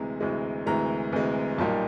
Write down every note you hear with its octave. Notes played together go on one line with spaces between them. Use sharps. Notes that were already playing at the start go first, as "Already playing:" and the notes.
Already playing: D2 C3 E3 G#3 A#5
D2 C3 E3 G#3
D2 C3 E3 G#3 A#5
D2 C3 E3 G#3
B1 A#2 G3 A#3 D#4 A5